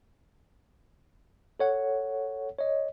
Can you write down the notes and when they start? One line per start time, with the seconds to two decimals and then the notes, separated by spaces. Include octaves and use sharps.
1.60 A4 C#5 F#5
2.59 C#5 D#5